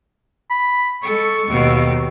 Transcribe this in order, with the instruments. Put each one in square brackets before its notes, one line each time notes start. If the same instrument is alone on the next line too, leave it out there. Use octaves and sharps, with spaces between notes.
[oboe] B5
[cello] G#3 A4 [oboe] C#6
[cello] D#2 B2